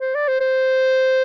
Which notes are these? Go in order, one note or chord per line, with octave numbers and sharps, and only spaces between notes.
C5
D5
C5
C5